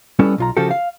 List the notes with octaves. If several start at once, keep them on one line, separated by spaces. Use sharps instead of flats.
G3 B3 C#4 E4 A4
B1 F4 A#5
C#3 F3 F#4 G4 A4
F5